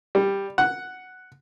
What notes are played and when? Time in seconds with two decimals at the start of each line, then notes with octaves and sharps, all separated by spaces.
0.15 G3
0.58 F#5